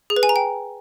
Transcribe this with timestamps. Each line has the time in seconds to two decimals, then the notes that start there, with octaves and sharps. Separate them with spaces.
0.10 G#4
0.16 B4
0.23 G#5
0.29 A#5
0.36 G5